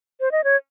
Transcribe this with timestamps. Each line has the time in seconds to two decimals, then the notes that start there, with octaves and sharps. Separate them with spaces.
0.21 C5
0.32 D#5
0.44 C#5